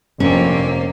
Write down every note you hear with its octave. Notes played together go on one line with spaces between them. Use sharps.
F1 F2 D3 A#3 C4 C#4